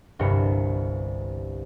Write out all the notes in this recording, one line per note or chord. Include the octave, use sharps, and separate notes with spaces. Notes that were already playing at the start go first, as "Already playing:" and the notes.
G1 C2 G2 A#4 C#7